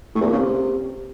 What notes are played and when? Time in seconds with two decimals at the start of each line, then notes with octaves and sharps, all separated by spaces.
0.15 A2
0.21 E2
0.27 A#2
0.33 C#3
0.38 C3